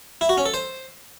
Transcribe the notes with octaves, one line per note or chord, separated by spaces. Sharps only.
E4
F#4
C#4
A4
C5